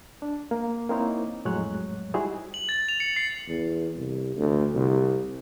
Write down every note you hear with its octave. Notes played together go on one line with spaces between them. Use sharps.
D4
A#3
A#3 C4 D#4 E4 C#5
F2 A2 F#3 G#3 C#5 F#6
G3 D#4 E4 F#4 G#4 C5
F#7
A6
F7
C#7
C7
E2
C2
D2
C2